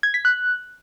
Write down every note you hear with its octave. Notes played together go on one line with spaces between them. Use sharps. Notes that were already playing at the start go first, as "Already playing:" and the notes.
G#6
B6
F#6